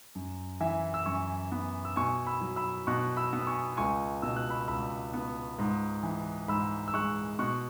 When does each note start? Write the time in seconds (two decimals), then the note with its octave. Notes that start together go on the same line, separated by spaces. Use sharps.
0.15 F#2
0.61 E3 E5 G#5
0.94 E6
1.06 F#2 G#5 C#6
1.52 B3
1.85 E6
1.96 B2 G#5 C#6
2.27 B5 E6
2.41 F#3
2.56 B5 E6
2.87 B2 C#6 F#6
3.17 B5 E6
3.33 B3
3.41 E6
3.47 G#5 C#6
3.77 C#2 G#5 C#6
4.22 B2 E6
4.36 F#6
4.50 B5 E6
4.68 C#2 B5 E6
5.13 B3
5.59 G#2
6.03 E3
6.48 G#2 B5 E6
6.88 E6
6.94 G#3 C#6 F#6
7.39 B2 C#6 F#6